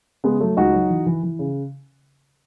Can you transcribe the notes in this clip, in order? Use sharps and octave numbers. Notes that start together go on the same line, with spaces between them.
C#3 G#3 B3
F#3 A3
C#2 D#4 F#4
F#3
E3
E3
E3
C#3